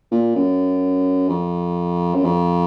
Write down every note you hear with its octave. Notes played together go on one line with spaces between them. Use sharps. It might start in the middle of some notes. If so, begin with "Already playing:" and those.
A#2
F#2
F2
F#2
F2